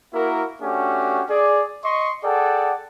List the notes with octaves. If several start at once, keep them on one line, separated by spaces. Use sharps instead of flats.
A#3 E4 F#4 A#4
A3 C#4 D4 F#4 G4
G#4 D5
D#5 C6 C#6
G#4 A4 D5 F#5 G5